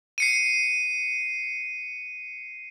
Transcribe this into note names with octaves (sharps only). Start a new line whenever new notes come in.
C7 C#7 D#7